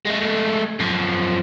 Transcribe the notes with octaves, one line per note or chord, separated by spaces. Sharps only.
G#3 A3
F#2 F3